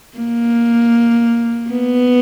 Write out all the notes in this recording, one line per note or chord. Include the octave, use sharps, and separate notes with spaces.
A#3
B3